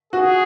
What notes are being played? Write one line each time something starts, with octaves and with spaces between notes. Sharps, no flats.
F#4 G#4